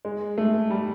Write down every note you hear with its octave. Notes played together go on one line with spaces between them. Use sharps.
G#3
A3
G3